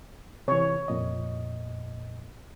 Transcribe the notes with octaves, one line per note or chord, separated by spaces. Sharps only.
C3 E3 C#5
F2 A#2 D#5